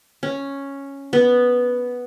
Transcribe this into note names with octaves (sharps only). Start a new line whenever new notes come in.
C#4
B3